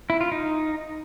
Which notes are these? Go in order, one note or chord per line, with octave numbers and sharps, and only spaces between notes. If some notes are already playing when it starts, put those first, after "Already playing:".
E4
F4
D#4